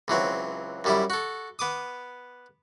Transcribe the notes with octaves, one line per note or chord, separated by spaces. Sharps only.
C#2 E3 F#3 C4
F#2 G3 E4
F#4 A4
B3 D6 D#6